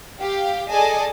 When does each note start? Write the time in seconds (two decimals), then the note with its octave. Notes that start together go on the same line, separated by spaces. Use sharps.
0.21 G4 F5
0.70 G#4 A4 D5 D#5 G#5 A5